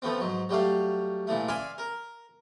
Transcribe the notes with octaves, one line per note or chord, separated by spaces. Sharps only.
F3 A3 B3 C4
G#2 F#3
F#3 G3 A3 F5
A#2 E3 A3
D5 E5 F5 G#5 C6 D6
A#4